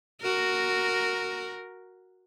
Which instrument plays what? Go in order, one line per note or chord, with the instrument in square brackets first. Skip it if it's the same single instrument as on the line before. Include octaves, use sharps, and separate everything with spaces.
[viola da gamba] F#4 A#4